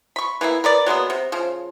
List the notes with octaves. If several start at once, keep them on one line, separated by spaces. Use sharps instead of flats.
B5 C#6
E3 A#3 B3 E4
A#4 B4 D5
F#3 G#3 A#3 B3
C3
C#3 F3